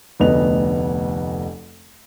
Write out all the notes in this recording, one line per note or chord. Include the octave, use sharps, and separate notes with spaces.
F1 D2 B3 D#5 F7